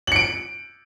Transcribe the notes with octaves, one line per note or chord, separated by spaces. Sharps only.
C#7 D7 F#7